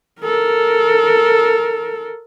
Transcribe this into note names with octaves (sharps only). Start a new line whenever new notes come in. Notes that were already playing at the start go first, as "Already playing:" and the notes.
A4 A#4